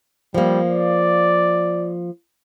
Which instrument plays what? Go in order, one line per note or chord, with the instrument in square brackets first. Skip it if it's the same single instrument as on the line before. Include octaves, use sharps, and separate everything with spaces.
[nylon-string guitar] F3 A#3 [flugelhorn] G3
[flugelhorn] D5